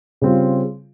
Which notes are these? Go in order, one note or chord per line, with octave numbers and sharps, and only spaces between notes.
C#3 G3 C4 F4